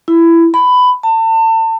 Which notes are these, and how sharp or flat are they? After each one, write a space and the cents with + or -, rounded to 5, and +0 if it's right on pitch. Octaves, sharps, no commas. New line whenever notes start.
E4 +15
B5 +15
A5 +35